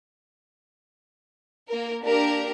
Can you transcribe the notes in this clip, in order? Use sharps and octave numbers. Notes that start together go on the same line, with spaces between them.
A#3 A#4
A#3 D4 G4 A#4